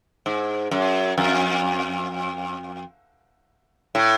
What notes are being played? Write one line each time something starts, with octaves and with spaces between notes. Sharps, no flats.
G#2
F#2
F2
A2